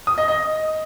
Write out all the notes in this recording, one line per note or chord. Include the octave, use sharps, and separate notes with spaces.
D#6
D#5
D#5